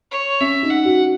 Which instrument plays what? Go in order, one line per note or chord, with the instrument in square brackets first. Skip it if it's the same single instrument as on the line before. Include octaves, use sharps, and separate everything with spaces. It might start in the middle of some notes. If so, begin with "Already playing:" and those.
[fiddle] C#5
[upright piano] C#4 [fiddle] E5
[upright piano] D#4
[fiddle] F#5
[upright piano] F#4